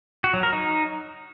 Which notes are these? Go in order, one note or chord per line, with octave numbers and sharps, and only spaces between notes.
F#4
F#3
A#4
D#4